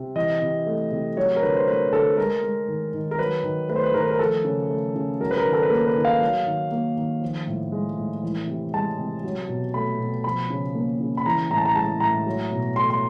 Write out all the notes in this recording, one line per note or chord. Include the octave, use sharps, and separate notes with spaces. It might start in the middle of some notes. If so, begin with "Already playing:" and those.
Already playing: C3
E3 D#5
C3
A3
C3
F#3 C#5
A#4
D3 B4
C5
A3 B4
D3 A4
G#3 A#4
G#3
D#3
D#3
A#4
F#3 B4
D#3
A3 B4
C5
B4
D#3 A#4
B4
A#4
F3 A4
C#3
A3
C#3
F#3 A#4
B4
A#4
D#3
A4
B4
A#3 A#4
B4
D#3
F5
F#3
D#3
A#3
D#3
F3
A2
G#3
A2
E3
C3
G#3 A5
C3
F#3
B2
A3 B5
B2
F3 B5
C#3
A#3
C#3
B5
E3 A#5
A2 A#5
A5
A#5
G#3 A5
A2 A#5
F#3
B2
A3 C6
C6